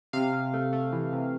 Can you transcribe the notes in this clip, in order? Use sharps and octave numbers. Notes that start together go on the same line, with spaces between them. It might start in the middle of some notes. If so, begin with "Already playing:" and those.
C3 F5
C3
A3
A3
E3
C3